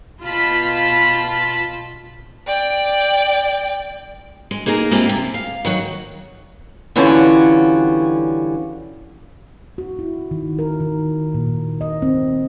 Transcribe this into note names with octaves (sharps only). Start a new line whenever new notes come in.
B2 F4 A5 B5 B6
D5 G5
G#3
A#3 D#4 G#4 A#4
G#3 A#3 C4 E4 F4 G4
C3
F5
D#3 F#3 F#4
D3 E3 G3 C#4 F4 F#4
F#4
E4
D#3
A#4
D#3
A#2
D#5
C4